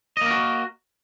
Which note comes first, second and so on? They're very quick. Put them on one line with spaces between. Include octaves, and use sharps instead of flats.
D#5 A#3 A#4 F#4